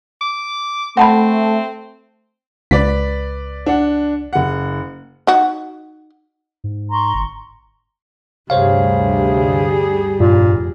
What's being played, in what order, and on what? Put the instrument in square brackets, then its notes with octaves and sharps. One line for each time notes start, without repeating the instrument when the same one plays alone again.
[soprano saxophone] D6
[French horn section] A3 [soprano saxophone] C4 [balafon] F#5 A5 B5
[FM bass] C#2 [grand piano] B4 D5 B6
[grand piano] D4 F#5
F#1 F#5
[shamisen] D#4 F#4
[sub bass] G#2
[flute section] A#5 C6 C#6
[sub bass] G1
[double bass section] D2 G2 [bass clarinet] C3 [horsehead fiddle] G3 G#4 [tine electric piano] C5 C#5 F5
[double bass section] F1 [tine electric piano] G2 [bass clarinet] A#2